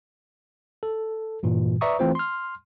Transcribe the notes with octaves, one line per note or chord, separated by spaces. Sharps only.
A4
G2 A#2 E3
B4 D5 E5 A#5 C#6 D#6
E3 A3 C4 F4 C5
C6 F6